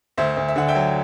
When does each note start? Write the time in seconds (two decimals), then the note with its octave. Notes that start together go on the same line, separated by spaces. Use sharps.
0.17 D2 C5 E5
0.37 D2
0.48 E5
0.56 D3 F#5
0.68 E5 G5
0.75 F#3